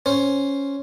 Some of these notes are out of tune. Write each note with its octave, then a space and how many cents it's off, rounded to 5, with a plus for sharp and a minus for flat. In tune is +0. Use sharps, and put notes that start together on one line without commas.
C#4 +0 C5 +0